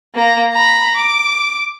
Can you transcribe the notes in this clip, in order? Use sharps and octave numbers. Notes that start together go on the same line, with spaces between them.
A#3 A#5
A#5 B5
D6